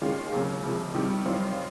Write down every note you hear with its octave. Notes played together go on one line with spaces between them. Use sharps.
D#2 D#3 G#3 C#4 F4
D#2 C#3 F#3 A#3 C#4
D2 C3 F3 G#3
C3 D#3 G3
F#2 D#3 G3 C4 F4